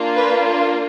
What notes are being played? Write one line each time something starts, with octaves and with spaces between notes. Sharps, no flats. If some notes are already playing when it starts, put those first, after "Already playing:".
Already playing: A#3 D4 F4
B4